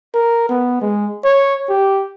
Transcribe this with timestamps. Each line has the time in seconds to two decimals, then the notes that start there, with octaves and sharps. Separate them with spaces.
0.14 A#4
0.50 B3
0.82 G#3
1.24 C#5
1.69 G4